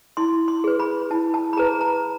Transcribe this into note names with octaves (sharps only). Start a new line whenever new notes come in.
E4 C6
C6
G#4 B4
B5
E4 A5
A5
B5
G#4 B4 A#5
A#5